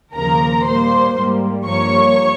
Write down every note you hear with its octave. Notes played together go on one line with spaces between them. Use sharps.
D#2 C#3 F3 A#3 A#4 A#5
A#2 G3 A#3 C5 C6
G#2 G3 A#3
G2 F3 A#3 C#5 C#6